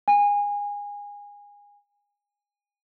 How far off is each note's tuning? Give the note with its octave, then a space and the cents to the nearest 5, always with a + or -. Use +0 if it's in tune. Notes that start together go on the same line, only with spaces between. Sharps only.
G#5 -25